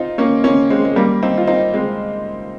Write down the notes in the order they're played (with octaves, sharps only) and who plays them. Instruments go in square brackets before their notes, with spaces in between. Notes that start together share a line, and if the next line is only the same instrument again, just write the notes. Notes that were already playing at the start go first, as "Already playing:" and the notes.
Already playing: [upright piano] C4 D#4 F4
A#3 C#4
A#3 C#4
G#3 C4
G#3
G3 A#3
C4 D#4
F4
C4 D#4
G#3 C4